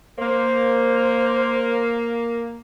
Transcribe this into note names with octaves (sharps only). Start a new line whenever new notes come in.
A#3 C5